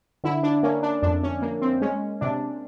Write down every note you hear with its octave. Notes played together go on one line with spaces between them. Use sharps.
D3 E4
D4
A#3 C#4
D4
F2 D4
C#4
A#3
C4
G#3 C#4
C3 D4